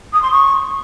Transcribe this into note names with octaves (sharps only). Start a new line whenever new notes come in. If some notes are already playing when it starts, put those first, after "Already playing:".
D#6
C6
C#6